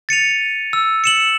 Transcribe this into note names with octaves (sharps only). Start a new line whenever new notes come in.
A6 C#7 D#7 F7
E6
C#7 E7 F#7